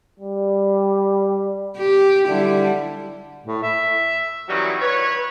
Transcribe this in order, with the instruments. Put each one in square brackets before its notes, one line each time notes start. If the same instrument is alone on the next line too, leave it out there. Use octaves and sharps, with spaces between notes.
[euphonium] G3
[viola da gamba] G4
[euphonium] D3 [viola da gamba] G3 E4
[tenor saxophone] A2
E5
[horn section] D#3 E3 F#3 G3 C#4 F#4
B4 C#5